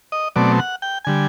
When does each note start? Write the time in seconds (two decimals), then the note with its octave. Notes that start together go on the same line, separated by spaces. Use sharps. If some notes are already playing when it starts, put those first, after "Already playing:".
0.12 D#5
0.36 B2 F#3 A3 C4 D5
0.59 F#5
0.82 G5
1.05 D3 G3 G#5